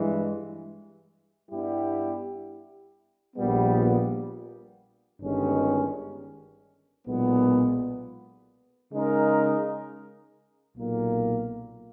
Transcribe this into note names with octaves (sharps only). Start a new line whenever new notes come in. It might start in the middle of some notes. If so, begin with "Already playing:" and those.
Already playing: G2 E3 G#3
G2 G3 B3 E4 G4
A#1 A#2 G3 B3
G1 G2 D#3 G#3 C#4
B1 A#2 G#3 B3
C#3 G#3 D#4 A#4
B1 A#2 A#3